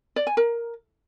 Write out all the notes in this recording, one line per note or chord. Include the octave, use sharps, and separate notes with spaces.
D5
G#5
A#4